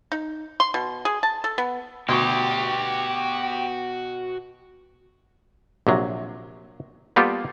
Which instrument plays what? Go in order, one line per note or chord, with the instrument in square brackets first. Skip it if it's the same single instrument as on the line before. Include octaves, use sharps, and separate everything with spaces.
[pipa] D#4
C6
B2
G#4
A5
A4
B3
[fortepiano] D2 [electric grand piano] B2 C#6 [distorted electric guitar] F#4 C6 [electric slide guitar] G4
[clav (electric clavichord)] A#1 C3 F#3
G3 A#3 B3 F4 G4 A4